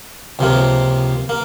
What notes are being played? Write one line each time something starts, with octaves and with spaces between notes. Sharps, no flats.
C#2 C3 F3 A#3
A#3